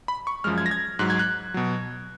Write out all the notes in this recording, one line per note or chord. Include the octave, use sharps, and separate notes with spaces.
B5
C#6
F#2 F3 G#3 F6
G#6
A#6
G#6
G#2 F#3 F#6
G#6
F#6
B2 F#3